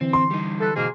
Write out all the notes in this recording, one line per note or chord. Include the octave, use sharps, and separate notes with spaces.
D3 E3 C4
C6
G3 D#4
A4 B4
G#2 B2 A#3 G#4